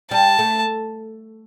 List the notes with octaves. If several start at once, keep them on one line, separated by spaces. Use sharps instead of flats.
G3 A5
A3